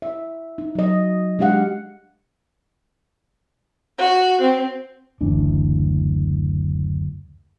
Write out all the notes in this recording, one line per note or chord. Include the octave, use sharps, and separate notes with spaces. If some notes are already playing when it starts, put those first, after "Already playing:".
E5
D#4
F#3 D#5
G#3 D4 G4 F5 F#5
F#4
C4
F#1 D2 E3 D4